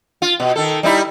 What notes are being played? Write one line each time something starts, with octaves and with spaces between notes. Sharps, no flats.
F4
B2
D#3 A4
G3 D#4 E4